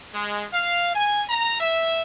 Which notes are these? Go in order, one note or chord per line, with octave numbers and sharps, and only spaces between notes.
G#3
F5
G#5
A#5
E5